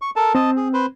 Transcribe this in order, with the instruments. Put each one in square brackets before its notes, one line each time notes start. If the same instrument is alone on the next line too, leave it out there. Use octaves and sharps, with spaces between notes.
[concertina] C#6
A4 A#4 A5
[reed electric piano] C4 [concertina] D#5 A5
[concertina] G#4
B4 C5